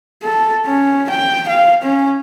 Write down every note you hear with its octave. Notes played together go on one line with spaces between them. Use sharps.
A4
C#4
G5
F5
C#4